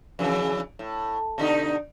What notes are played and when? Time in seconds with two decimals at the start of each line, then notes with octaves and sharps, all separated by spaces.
0.19 F2 C#3 E3
0.79 A2
1.38 B2 D3 D#4